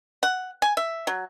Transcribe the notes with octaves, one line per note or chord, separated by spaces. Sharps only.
F#5
G#5
E5
F#3